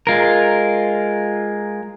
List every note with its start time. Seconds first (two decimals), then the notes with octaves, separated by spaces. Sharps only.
0.07 G#3 F4 A#4